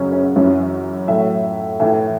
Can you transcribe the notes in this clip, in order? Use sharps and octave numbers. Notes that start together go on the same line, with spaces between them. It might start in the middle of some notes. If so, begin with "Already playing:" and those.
Already playing: F#2 C#3 F#3 C#4
C#4
F#2 E3 C#4
A2 F#3 E5
A2 E3 E5